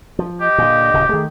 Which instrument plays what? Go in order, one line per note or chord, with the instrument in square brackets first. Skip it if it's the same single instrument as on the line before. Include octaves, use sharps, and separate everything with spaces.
[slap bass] F3
[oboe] G4 [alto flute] D#5
[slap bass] A#2 D3
D1 C#3
[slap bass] D#3 A3 [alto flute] G#4